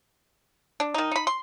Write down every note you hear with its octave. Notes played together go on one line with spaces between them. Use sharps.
D4
D#3 D#4
D#4 B5
C6